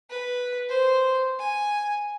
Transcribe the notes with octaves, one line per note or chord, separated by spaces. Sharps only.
B4
C5
G#5